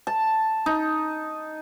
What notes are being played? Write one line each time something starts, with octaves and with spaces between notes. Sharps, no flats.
A5
D#4